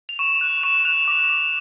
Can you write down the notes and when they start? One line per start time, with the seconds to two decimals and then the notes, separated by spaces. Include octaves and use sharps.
0.09 F7
0.19 C#6 E7
0.41 F#6
0.63 C#6 E7
0.85 F#6 F7
1.08 D6